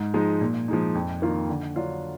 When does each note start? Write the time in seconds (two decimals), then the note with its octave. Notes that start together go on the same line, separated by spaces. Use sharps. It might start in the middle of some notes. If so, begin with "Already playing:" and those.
Already playing: G#2
0.14 F3 G#3 D#4
0.41 A#2
0.68 F3 G#3 D#4
0.95 F2
1.22 D#3 A#3 F4
1.49 D3
1.76 F#3 D4 F4